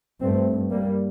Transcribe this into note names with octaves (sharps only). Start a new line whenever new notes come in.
G2 A3 C4
G3 A#3